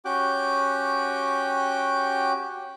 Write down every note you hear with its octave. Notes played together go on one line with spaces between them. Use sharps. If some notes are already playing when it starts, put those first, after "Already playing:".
C#4 F#4 G4 G5 D6 F#6